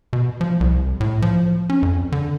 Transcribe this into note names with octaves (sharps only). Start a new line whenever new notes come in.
B2
F3
C2
A2
F3
C#4
F2
D3